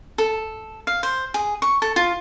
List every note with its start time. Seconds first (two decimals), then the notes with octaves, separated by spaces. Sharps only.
0.18 A4
0.87 F5
1.03 C5
1.34 G#4
1.62 C#6
1.82 A4
1.96 F4